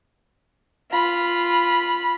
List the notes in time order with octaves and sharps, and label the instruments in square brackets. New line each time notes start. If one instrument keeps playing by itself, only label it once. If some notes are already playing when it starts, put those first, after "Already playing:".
[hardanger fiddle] F4 B5